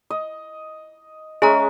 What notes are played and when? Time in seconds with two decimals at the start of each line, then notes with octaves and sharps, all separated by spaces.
0.10 D#5
1.42 G#3 C#4 G#4 E5 A#5